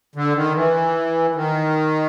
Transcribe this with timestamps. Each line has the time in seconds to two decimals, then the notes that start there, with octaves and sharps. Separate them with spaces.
0.16 D3
0.35 D#3
0.55 E3
1.35 D#3